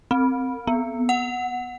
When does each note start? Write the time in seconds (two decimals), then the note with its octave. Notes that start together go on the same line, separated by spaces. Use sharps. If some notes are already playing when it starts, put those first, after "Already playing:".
0.11 C4
0.67 B3
1.09 F#5